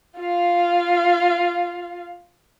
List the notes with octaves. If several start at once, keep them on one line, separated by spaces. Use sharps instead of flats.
F4 F5